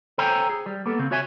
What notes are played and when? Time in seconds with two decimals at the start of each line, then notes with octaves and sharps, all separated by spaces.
0.18 A4 C5 C#5 G5 G#5 A#5
0.50 G#4
0.66 G3
0.86 A#3 B3 A4
0.99 C#3 C4
1.11 F#4 C#5 E5 G#5